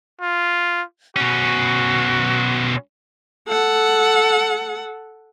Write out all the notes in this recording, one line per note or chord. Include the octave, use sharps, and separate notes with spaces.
F4
B2 C#4 F#4
A4 F#5